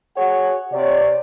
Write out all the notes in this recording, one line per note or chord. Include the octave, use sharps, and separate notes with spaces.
F#4 G#4 C#5 F#5
C3 C#5 D5